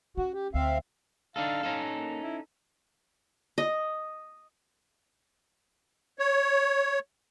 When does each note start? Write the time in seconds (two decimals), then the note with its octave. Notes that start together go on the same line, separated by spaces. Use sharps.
0.17 C#4 F#4
0.34 G4
0.54 D2 C4 E5 F5
1.36 D4 D#4 A4 F5
1.63 C#4 D#4 A4
1.91 A#3
2.23 E4
3.58 D#5
6.19 C#5